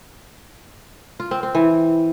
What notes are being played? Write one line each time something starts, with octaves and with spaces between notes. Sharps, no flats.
F4
C4
C4
E3